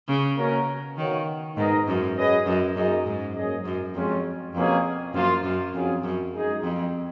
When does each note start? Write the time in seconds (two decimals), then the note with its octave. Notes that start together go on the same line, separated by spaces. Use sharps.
0.08 C#3
0.38 B2 A#3 C#4 F#4 A#4
0.97 D#3 B3 F#4 C#5 F5
1.57 G#2 B3 D#4 A#4 D#5
1.87 F#2
2.16 F#3 C#4 G#4 B4 D#5
2.46 F#2
2.76 F#2 A#3 D#4 G#4 D#5
3.06 G#2
3.35 F#3 A#3 C#4 G#4 D#5
3.65 F#2
3.95 F2 G#3 C#4 F4
4.54 F2 B2 A#3 C#4 G#4
5.14 F#2 F3 A#3 F4
5.44 F#2
5.74 F2 F#3 C#4 F4 G#4
6.03 F#2
6.33 G#3 D#4 G#4
6.63 F2